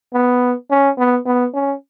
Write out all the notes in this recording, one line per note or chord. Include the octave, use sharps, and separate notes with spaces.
B3
C#4
B3
B3
C#4